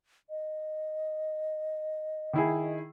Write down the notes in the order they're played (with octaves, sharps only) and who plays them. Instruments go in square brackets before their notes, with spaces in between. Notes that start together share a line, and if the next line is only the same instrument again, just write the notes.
[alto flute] D#5
[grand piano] D#3 E4 G#4